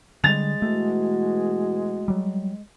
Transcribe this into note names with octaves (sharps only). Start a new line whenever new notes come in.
D3 G3 G#3 A6 F7
B2 E3 A3 F#4
F#3 G3